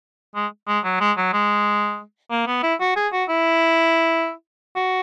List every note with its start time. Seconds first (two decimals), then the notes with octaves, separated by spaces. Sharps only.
0.35 G#3
0.68 G#3
0.84 F#3
1.00 G#3
1.17 F#3
1.33 G#3
2.31 A#3
2.47 B3
2.63 E4
2.80 F#4
2.96 G#4
3.13 F#4
3.29 E4
4.76 F#4